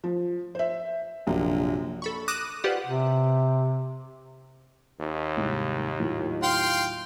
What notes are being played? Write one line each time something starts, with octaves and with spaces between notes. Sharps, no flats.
F3
C5 E5
A#1 F#2 C3
A4 B5 C#6
D6 D#6 F#6 A#6 D#7 E7
F4 G4 B4 C5 D5 F#5
C3
D#2
C2 G#2
A2 F#3 F4
F5 G5 C6